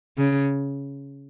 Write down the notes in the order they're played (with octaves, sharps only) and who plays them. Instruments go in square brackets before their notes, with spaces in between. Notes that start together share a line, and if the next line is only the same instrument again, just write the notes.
[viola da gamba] C#3